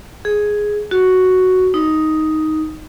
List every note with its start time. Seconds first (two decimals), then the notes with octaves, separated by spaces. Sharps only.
0.25 G#4
0.91 F#4
1.74 D#4